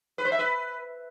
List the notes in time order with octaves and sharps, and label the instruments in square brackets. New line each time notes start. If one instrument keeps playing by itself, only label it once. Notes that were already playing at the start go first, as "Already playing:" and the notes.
[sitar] B4
C5
E5
B4